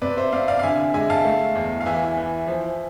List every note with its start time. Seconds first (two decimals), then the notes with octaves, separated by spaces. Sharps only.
0.02 C3 B4 D5
0.17 C5 E5
0.32 C3 D5 F5
0.48 D5 F5
0.59 F5
0.63 D3 E5 G#5
0.94 G#3 E5 G#5
1.10 F5 A5
1.25 A3
1.55 E2
1.81 F5
1.86 E3 E5 G#5
2.17 E3
2.47 F3